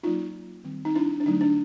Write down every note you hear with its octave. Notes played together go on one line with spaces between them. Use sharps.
F#3 A#3 C#4 D#4 F4
D#3 G3 C4
D#4
D4 E4
D4
D3 F#3 A3 D#4
D4